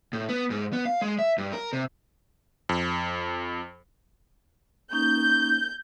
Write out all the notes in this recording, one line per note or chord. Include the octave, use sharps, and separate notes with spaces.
A2
B3
G#2
B3
F5
G#3
E5
G2
A#4
C3
F2
A#3 C#4 D#4 G6